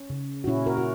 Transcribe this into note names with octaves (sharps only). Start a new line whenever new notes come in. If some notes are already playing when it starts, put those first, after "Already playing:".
Already playing: C#4
C#3
F#4
A#2 C#4 E4
F#4 A#4
F#4